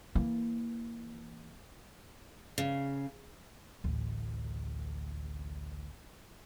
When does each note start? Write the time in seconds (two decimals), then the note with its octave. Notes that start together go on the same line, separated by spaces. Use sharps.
0.15 E3 A#3
2.58 C#3
3.84 A1 D2